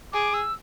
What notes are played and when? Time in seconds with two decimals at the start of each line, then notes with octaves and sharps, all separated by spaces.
0.12 G#4 D6
0.34 E6